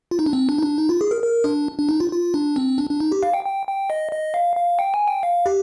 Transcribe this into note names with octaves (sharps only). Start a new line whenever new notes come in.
F4
D#4
D4
C4
D4
D#4
D4
D#4
F4
G#4
A#4
A#4
D4
D4
D#4
F4
F4
D4
C4
D4
D4
D#4
G4
F5
G5
G5
G5
D#5
D#5
F5
F5
G5
G#5
G5
F5
G4